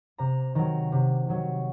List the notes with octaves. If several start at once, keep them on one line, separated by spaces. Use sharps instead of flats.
C3 A#5
D#3 F#3 A#5
C3
D#3 F#3